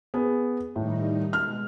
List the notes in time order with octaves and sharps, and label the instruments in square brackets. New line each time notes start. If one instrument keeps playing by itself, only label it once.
[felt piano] B3 G#4
[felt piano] A2 [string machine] D#3 G3 D#4
[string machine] B2 G#3 [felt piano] F6